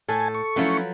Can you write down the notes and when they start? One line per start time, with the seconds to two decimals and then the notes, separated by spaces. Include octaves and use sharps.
0.09 A2 A4 G#5 A5
0.35 C#6
0.56 F3 F#3 A3 C#4 E4 B4